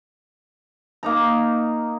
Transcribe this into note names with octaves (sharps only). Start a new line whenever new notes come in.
A#3 D#4 A#5